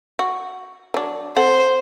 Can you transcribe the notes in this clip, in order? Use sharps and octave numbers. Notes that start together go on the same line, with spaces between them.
F#4
F#3 D4
C4 A4 C5 F#5